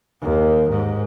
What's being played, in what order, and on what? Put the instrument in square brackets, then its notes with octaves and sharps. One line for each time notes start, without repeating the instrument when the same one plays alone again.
[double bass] D#2
G#2